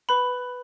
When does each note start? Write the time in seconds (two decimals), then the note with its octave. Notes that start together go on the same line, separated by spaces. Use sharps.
0.09 B4 B5